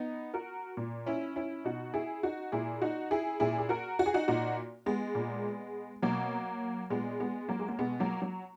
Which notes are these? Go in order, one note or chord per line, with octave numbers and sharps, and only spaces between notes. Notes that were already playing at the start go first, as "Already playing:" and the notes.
Already playing: B3 D#4
F#4 A#4
A#2
C#4 E4
C#4 E4
B2 D#4 F#4
E4 G#4
D#4 F#4
A#2 E4 G#4
D#4 F#4
E4 G#4
A#2 E4 G#4
G#4
F#4 A#4
F#4
G#4
D#4 F#4
A#2 D#4 F#4
G#3 B3
A#2
B2 F#3 A#3
A#2 G#3 B3
G#3 B3
F#3 A#3
G#3
A#3
B2 G#3 B3
F#3 A#3
F#3